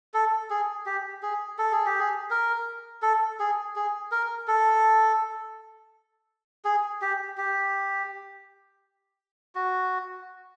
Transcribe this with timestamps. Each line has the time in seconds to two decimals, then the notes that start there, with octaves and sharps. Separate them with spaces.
0.14 A4
0.50 G#4
0.86 G4
1.22 G#4
1.58 A4
1.72 G#4
1.86 G4
2.00 G#4
2.31 A#4
3.02 A4
3.40 G#4
3.76 G#4
4.12 A#4
4.48 A4
6.65 G#4
7.02 G4
7.37 G4
9.55 F#4